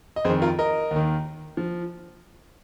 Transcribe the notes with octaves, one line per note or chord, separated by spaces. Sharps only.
D#5
F2 D#3 G#4 C5
F4 A#4
A#4 D#5
D#2 D#3
F3